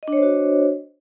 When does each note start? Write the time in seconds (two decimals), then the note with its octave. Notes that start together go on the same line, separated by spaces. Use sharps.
0.03 D#5
0.08 D4
0.13 C#5
0.17 C5
0.22 F#4